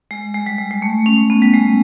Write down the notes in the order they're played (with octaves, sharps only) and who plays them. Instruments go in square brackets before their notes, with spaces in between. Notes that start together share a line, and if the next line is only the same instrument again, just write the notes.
[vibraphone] G#3
G#3
G3
G#3
G#3
A3
C#4
B3
G3
G#3